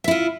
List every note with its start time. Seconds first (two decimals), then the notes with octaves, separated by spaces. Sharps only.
0.04 E5
0.08 E4
0.11 F4